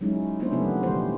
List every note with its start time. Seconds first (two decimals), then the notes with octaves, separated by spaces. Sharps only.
0.01 F#3 G#3 C#4 D#4 E4
0.40 A#3 B3 C#4 D4 E4 C5
0.52 C3 F3 G3 A3 B3
0.83 A#2 D3 E3 G3 C5